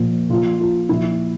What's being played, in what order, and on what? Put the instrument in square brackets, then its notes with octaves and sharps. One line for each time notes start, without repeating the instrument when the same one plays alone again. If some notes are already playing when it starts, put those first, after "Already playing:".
Already playing: [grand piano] A#2 F3
A#2 F3 F4
F4
A#2 F3 E4